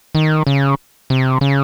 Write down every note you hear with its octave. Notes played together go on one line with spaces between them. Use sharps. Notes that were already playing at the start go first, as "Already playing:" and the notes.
D#3
C#3
C3
C#3